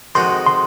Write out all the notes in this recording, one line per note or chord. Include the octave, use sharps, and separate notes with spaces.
F2 D#3 G#3 D#4 F#4 C6
C6